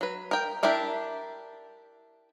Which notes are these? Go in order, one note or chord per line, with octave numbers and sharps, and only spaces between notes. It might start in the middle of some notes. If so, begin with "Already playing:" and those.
F#3 B4
A#4 G5
D4 E4 G4 A#4 E5